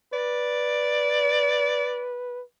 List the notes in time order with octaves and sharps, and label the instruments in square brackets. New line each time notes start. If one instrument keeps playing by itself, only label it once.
[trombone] B4 [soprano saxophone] D5